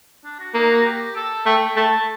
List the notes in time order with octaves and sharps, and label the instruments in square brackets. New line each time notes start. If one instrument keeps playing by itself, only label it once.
[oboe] D4
F#4
[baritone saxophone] A#3 [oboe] D#4
[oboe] F#4
G4
A4
[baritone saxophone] A3 [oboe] G5
[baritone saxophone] A3 [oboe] A5